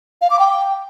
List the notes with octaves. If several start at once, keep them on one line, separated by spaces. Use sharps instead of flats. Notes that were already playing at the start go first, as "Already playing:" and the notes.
F5
D6
G5